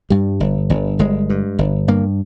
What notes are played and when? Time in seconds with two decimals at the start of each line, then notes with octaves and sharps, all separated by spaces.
0.10 G2 G3
0.40 G1
0.70 G1
0.99 G1 G#3
1.30 G2
1.59 G1
1.88 G2 A#3